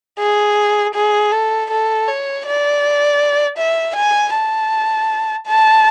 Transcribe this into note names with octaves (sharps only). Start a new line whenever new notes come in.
G#4
G#4
A4
A4
C#5
D5
E5
G#5
A5
A5